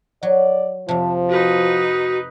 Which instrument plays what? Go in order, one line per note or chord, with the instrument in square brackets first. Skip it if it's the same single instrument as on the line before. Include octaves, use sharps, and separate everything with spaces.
[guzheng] F#3 [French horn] D5
[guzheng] F2 C3 [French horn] F3 [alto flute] A5
[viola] D#4 B4 [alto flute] F#4